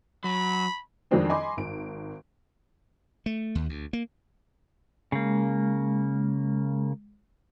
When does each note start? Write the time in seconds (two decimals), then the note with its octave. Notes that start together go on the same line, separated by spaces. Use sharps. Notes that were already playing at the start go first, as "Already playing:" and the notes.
0.24 F#3 B5
1.11 F2 D#3 F#3 G#3 C4 D4
1.29 D#5 G#5 B5 C6 D6
1.57 G#1 D7
3.26 A3
3.55 D#2
3.69 D2
3.93 A#3
5.12 C#3 G#3 A#3